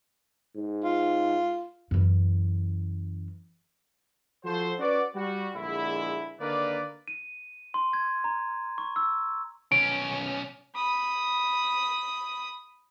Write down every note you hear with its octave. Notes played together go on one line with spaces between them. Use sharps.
G#2
F4
F#2 E3
F3 F#4 A4 C5
C#4 F#4 B4 D5
G3 F#4
A#1 D3 G#3 E4
D3 D#3 A#3 A#4 B4 D5
D#7
C6
G#6
A#5
C#6
E6
B1 C#4 D7
B5 D#6